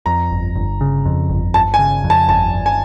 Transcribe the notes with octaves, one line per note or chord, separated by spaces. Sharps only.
F2 A#5
G1
G1
C#3
F2
G1
G1 A5
G#5
C#3
F2
A5
G1 A5
G1
G#5